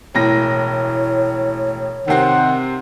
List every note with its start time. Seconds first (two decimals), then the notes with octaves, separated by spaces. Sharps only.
0.15 E1 A2 C#5 A#6
2.08 C3 D#3 C4 F#5